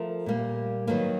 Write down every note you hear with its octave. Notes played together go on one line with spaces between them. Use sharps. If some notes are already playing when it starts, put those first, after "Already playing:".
Already playing: F3 A3 A#4
A#2 G3 A#3
D#3 F#3 A#3 B4